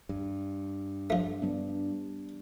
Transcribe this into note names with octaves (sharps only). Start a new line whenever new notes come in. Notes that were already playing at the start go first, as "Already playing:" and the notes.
G2
F3 A3
G3 B3 D4